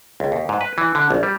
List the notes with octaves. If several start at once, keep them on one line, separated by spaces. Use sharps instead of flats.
C#2
D#2
G#2
B4
E3
D3
A#1
G3